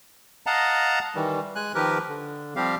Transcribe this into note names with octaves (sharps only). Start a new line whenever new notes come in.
D#5 F5 F#5 A5 A#5
D#3 E3 G3
G#3 G#5 F#6
D#3 F3 G4 A#4 B4
D3
F3 G3 C4 G4 F5